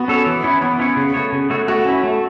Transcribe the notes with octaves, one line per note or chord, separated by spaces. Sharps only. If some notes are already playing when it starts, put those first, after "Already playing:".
Already playing: B3 F#4
C#4 A4 C#5
E3
C#4 E4 C#5
E3 B3
C#4 E4 C#5
C#3
A3 F#4 C#5
C#3
A3 F#4 C#5
A3 F#4
C#4 E4
A3